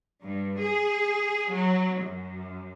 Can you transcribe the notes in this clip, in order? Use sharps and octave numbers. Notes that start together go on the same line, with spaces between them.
G2
G#4
F#3
F#2